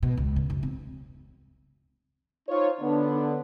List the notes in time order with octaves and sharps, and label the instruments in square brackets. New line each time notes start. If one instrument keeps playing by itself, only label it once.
[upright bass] B2
C#2
C#3
F#2
C4
[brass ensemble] D#4 F4 C5 C#5
D3 B3 D4